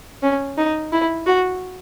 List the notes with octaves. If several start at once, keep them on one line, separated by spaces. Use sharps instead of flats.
C#4
D#4
E4
F#4